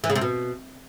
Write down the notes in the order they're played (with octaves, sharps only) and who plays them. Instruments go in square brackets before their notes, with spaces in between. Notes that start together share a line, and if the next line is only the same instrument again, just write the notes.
[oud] E3
C#3
C3
B2